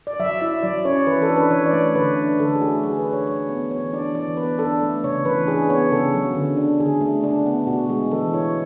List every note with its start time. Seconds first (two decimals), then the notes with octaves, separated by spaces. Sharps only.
0.07 D5
0.20 F#3 E5
0.41 E4 E5
0.63 F#3 D5
0.85 C#4 C#5
1.07 E3 B4
1.22 A4
1.30 D4
1.36 B4
1.51 E3 C#5
1.66 D5
1.73 A3
1.81 C#5
1.96 D3 B4
2.17 D4
2.39 D3 A4
2.55 G#4
2.61 A3 F#4
2.83 F#3 G#4
2.99 B4
3.05 D4
3.13 C#5
3.27 F#3 C#5
3.49 B3
3.71 E3 C#5
3.93 D4 D5
4.15 E3 D5
4.37 B3 B4
4.59 D4 A4
4.82 A3
5.04 C#3 C#5
5.25 E3 B4
5.47 D4 G#4
5.70 B3 C#5
5.92 C#3 A4
6.14 F#3
6.35 D3
6.57 D4
6.80 D3 G#4
7.01 A3
7.24 D4
7.46 B3
7.67 B2 F#4
7.89 G#3 G#4
8.11 E3 A4
8.33 E4 C#5